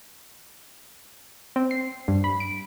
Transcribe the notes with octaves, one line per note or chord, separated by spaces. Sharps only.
C4
C7
G2
B5
D7